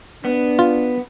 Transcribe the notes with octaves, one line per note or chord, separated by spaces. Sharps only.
B3 D4
F4